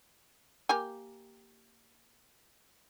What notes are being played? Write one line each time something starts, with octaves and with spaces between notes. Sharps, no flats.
A#3 G4 G#5